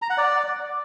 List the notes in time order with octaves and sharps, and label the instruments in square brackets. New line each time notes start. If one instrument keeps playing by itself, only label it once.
[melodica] A#5
F#5
D5